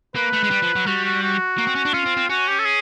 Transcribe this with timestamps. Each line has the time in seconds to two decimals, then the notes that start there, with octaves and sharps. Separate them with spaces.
0.15 A#3 B4
0.33 A3
0.43 G#3
0.51 G3
0.62 F3
0.75 F#3
0.86 G3 F#4
1.04 F#4
1.23 F#4
1.58 A#3
1.67 C4
1.75 C#4
1.85 D4
1.94 C#4 F4
2.06 C4
2.17 C4
2.30 C#4 F#4
2.47 G4
2.59 A4
2.65 G#4